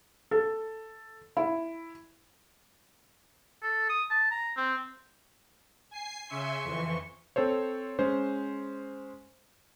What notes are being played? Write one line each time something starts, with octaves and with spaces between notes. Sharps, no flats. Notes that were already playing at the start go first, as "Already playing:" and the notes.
A4
E4
A4
D#6
A5
A#5
C4
G#5 C7
C#3 E5 G#5 C6 C#6
F2 E3
C4 A4 C5 C#5
G#3 C#4 C5